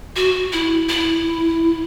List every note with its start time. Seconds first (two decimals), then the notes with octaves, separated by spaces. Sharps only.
0.16 F#4
0.53 E4
0.89 E4